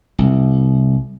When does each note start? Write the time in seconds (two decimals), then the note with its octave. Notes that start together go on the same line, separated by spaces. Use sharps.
0.19 C2